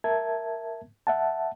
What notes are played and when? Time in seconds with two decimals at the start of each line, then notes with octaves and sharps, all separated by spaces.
0.04 A#4 E5 A5 G#6
1.07 E5 F#5 A5